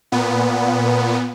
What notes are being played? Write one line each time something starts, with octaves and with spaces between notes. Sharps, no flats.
A#2 B3